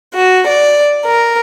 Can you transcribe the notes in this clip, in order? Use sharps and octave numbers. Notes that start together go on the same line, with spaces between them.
F#4
D5
A#4